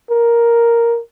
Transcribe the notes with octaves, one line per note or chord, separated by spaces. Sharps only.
A#4